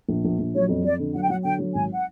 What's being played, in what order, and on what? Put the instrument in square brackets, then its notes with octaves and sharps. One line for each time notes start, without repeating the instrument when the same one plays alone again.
[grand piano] A#1
A#1
A#1
[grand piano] F#3 [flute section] C#5
[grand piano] F2
[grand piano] F2 [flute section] D5
[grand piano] D3
[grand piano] F#3 [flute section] F#5
[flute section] G5
[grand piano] F#3 [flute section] F#5
[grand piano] D3 [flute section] G5
[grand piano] F#3
[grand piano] G#1 [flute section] G#5
[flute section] F#5